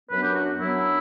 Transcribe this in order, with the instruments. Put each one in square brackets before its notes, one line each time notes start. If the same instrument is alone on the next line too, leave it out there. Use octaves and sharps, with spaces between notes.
[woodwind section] F#2 F#3 B3 D4 B4
G4
F#4
F#2 F#3 B3 D4 E4